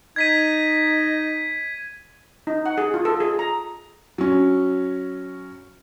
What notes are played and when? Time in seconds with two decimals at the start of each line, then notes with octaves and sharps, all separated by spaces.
0.16 D#4 G#6 B6 D#7
2.47 D#4
2.66 F#5
2.78 G#4
2.94 F4
3.05 A4
3.20 G#4
3.39 A#5
4.18 F#3 C#4